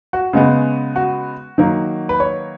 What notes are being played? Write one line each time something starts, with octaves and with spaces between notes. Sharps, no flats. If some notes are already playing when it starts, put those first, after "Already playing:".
F#4
C#3 G#3 B3
F#4
D#3 F#3 A#3
B4
C#5